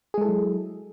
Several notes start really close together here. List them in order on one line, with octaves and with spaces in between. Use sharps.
G#4 G#3 A4 E4 F#3